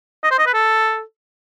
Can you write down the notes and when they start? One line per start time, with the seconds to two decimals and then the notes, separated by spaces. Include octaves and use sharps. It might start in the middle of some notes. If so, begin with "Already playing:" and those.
0.23 D#5
0.31 C5
0.39 D#5
0.46 B4
0.54 A4